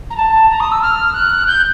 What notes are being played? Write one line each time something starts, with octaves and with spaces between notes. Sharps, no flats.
A#5
A5
A#5
D#6
E6
F6
F#6
G6